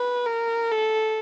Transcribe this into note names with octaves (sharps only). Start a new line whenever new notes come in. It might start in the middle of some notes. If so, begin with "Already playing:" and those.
Already playing: B4
A#4
A4